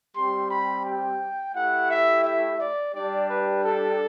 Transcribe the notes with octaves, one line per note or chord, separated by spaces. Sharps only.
G3 C4 G4 C6
B5
G5
A3 E4 G4 F#5
E5
E5
D5
G3 D4 G4 D5
B4
A4